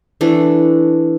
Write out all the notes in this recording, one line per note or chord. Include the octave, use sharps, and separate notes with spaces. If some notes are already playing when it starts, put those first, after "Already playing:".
E3 A3 D4